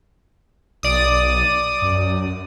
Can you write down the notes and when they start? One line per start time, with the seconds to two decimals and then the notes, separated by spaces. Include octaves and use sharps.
0.83 B1 D5 D#6
1.82 F#2